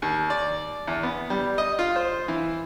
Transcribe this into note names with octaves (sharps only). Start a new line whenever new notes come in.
D#2
D5
E2
B3
G3
D#5
F4
C5
E3